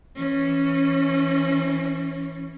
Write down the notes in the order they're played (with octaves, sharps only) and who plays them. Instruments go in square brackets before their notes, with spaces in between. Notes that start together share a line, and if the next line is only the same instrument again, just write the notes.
[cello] E3 C#4